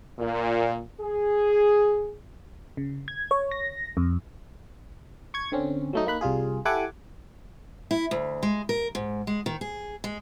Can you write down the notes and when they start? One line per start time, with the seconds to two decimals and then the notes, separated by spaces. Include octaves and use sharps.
0.19 A#2
1.01 G#4
2.77 C#3
3.08 G#6
3.31 C#5
3.51 A#6
3.97 F2
5.34 C#6 G#6
5.52 D3 C4 C#4
5.93 F#3 A3 D#4
6.06 A#3 D#4 B5 F#6
6.21 C2 G3 F4 G#4
6.65 E4 G4 A4 F#5 G#5 D6
7.91 E4
8.11 D2
8.43 G#3
8.69 A#4
8.95 G#2
9.27 G#3
9.46 D#3
9.61 G#4
10.04 G#3